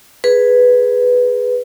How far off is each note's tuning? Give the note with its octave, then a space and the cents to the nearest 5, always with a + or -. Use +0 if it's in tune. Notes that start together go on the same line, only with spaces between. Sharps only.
G#4 +0 B4 +0